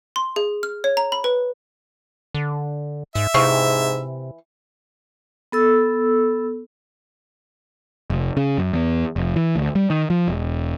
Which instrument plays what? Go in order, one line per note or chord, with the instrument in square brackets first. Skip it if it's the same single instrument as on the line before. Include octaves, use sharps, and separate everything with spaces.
[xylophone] C6
G#4
F6
C#5
A#5
B5
B4
[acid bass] D3
[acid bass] G#2 [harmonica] E5
[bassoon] G#2 [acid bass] C3 [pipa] E3 F5 C#6
[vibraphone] B3 A4 E6
[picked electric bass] F1
C#3
F#2
E2
F1
E3
D2
G3
D#3
F3
E1